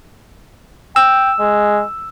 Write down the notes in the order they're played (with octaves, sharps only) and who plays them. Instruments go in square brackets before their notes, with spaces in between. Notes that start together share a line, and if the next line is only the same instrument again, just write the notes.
[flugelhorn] G5 [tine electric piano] E6
[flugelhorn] G#3